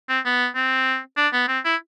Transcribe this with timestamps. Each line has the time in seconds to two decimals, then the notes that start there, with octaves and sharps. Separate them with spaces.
0.09 C4
0.25 B3
0.55 C4
1.17 D4
1.33 B3
1.48 C4
1.64 E4